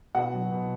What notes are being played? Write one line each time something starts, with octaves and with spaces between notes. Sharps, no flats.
B2 F#4 F#5
F#3
B2